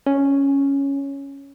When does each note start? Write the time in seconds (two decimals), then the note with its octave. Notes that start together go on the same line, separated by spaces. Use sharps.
0.06 C#4